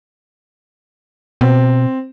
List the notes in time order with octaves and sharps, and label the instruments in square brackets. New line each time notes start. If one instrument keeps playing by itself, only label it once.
[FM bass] B2 [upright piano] C4